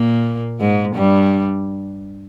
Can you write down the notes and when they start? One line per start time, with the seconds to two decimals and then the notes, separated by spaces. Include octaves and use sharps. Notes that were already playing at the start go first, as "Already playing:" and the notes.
Already playing: A#2 A#3
0.60 G#2 G#3
0.95 G2 G3